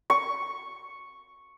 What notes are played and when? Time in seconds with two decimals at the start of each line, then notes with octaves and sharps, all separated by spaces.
0.10 C#6